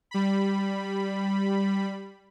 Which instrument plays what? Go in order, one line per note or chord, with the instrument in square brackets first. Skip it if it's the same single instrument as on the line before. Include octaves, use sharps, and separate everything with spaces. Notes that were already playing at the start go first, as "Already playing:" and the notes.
[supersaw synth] G3 B5